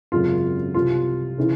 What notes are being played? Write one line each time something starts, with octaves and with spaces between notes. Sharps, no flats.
G#1 F#2 C#3 F#3 F4
C2 C3 F3 F4
C#3 E3